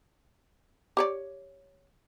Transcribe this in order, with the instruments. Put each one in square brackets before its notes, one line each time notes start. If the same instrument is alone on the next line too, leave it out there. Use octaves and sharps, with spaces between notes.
[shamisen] G4 C#5 D5